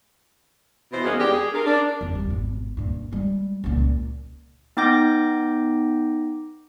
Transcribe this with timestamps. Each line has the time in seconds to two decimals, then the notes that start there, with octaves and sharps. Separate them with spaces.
0.92 E2 B2 E4 C5
1.04 D#3 F#3 G#3 A#3 B3 C#4
1.19 E2 G#3 D4 G4
1.32 G#4
1.52 D4 F4 A#4
1.66 D4
2.01 F2 G#3
2.15 F2 G3
2.30 G#1 B2
2.77 G2 A#2
3.12 G3 G#3
3.64 C#2 A#2
4.77 B3 D#4 G5 D6 G6 A#6